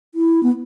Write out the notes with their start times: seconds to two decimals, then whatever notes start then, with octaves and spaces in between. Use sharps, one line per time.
0.15 E4
0.43 B3